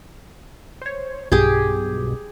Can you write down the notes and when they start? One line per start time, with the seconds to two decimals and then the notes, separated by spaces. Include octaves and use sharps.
0.82 C5 C#5
1.32 B1 G2 B2 G4 G#4